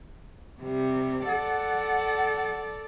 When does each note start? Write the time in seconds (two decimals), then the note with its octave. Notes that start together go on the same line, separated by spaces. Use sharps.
0.61 C3 G3
1.26 A4 D5 F#5